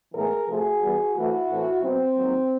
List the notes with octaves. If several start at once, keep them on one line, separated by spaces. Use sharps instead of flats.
A2 E3 G#3 B3 G#4 A#4
C3 F3 A3 C4 F#4 G#4
E3 G3 B3
E3 A3 C4 E4 F#4
A2 E3 A3 C4
B2 F#3 B3 C4
D#3 F#3 A#3